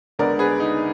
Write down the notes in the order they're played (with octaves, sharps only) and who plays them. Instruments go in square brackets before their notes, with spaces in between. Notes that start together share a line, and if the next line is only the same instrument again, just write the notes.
[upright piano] D2 D3 G#3 B3 A#4 D5
G#4 B4
D#4